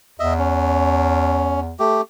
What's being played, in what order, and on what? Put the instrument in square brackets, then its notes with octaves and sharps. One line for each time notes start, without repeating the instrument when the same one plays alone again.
[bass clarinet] E2 [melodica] D#5 E5
[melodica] C#4
A3 G4